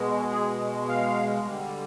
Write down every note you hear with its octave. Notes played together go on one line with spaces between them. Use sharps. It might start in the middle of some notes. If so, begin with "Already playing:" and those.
Already playing: B2 G#3
G#4
F5
D3 G3